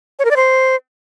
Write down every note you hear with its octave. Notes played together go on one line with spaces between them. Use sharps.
C#5
A#4
D5
C5